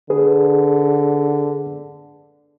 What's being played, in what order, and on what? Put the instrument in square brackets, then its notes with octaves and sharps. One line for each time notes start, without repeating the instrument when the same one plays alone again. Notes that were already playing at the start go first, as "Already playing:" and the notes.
[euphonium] D3 [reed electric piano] G#4 B4